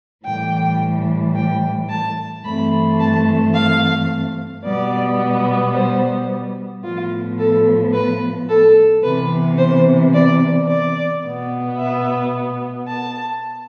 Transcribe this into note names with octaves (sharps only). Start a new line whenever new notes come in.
A2 E3 G3 G5
G5
A5
G2 E3 A3 C4 B5
A5
F5
B2 G3 B3 D5
C5
A2 F3 B3 F4
A4
B4
A4
C3 E3 B3 B4
C5
D5
D5
B2 B3
E5
A5